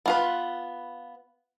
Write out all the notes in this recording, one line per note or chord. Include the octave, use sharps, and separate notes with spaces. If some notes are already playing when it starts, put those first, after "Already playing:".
B3 F4 B4